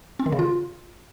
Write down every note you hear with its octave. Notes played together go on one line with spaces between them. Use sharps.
C4
D#3
C#3
F4